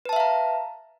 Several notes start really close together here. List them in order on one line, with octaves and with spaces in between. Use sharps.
B4 A5 E5 F5 A#5